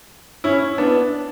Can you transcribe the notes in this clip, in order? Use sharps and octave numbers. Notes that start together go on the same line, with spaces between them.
C#4 E4
B3 D4